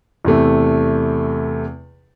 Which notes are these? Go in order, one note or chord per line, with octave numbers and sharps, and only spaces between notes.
E2 C3 A3